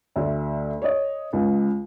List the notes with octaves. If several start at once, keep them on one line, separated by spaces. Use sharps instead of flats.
D2 E5
C#5 D#5
C#2